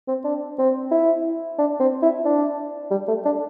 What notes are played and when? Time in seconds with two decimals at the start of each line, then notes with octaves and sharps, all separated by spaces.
0.08 C4
0.24 D4
0.59 C4
0.91 E4
1.58 D4
1.80 C4
2.02 E4
2.25 D4
2.91 G3
3.08 A3
3.25 D4